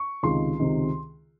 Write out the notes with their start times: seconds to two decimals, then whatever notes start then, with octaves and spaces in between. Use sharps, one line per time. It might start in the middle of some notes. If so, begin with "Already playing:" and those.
Already playing: C#6
0.23 C#2 C3 D#3 C6
0.60 C#2 C3 D#3